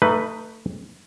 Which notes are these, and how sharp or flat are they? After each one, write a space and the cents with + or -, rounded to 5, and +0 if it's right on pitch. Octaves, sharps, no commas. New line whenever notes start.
A3 +25 D#4 +0 B4 +0